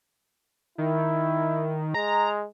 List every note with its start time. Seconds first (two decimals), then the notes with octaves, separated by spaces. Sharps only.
0.78 D#3 E4
1.94 G#3 A#5